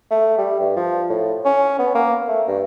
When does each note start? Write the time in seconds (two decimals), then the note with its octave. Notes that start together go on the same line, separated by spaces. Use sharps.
0.11 A3
0.38 G3
0.60 G2
0.76 F3
1.09 A2
1.45 C#4
1.79 B3
1.95 A#3
2.28 A3
2.48 G2